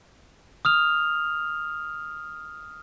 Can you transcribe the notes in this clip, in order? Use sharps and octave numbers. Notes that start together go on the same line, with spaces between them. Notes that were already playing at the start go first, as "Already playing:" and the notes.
D#6 F6 F7